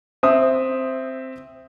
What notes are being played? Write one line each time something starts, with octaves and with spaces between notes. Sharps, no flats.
C4 E5 C6 D#6